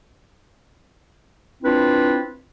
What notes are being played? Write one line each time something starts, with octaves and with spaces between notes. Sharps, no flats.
C4 D4 E4 F4 B4